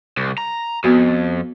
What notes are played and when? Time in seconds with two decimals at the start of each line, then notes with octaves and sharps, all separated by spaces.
0.17 C2
0.38 A#5
0.84 F2 B3 F#4